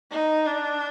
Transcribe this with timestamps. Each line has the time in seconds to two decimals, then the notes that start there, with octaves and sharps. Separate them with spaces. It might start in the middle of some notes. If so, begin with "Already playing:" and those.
0.11 D#4
0.46 D4